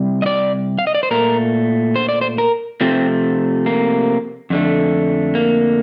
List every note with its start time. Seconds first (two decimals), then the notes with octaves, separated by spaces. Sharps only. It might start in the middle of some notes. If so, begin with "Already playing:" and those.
Already playing: C3 G3
0.22 D#5
0.26 D5
0.79 F5
0.87 D#5
0.95 D5
1.03 C5
1.11 A#2 A3 A#4
1.96 C5
2.09 D5
2.21 C5
2.38 A#4
2.81 C3 F3 A3 C4
3.66 A#3
4.50 F2 D3 A3
5.35 A#3